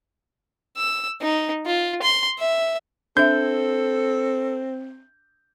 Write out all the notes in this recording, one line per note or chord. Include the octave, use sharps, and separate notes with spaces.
E6
D#4
F4
C6
E5
C4 D4 A4 E5 G6